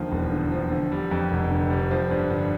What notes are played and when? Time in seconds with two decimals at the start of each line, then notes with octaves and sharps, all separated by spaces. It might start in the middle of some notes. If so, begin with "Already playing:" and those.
Already playing: D#2 D3 F3
0.12 E1
0.32 D3
0.51 F3
0.71 D3
0.92 G3
1.11 F2
1.31 F1
1.51 D3
1.70 G3
1.91 F3
2.11 G2
2.30 D3